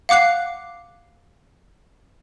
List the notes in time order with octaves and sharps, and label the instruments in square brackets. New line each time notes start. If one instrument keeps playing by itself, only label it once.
[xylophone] F5 F#5 D6 F#6 C7